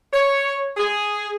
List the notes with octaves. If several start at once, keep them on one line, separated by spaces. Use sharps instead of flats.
C#5
G#4